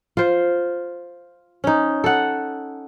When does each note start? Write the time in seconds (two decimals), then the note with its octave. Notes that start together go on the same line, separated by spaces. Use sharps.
0.17 F4 C5
1.64 C#4 D#4
2.04 A4 F#5